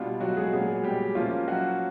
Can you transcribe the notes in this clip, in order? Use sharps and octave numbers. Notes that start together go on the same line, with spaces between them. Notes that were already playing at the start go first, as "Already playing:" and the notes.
Already playing: B2 G3 B3 D4 F4
F#3 F#4
G#3 G#4
A#2 F#3 G#3 B3 G#4
G3 G4
F3 A#3 C#4 F4
F#3 F#4